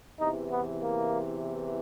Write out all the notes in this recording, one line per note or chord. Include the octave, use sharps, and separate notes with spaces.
E2 C3 E3 D#4
B3
A#3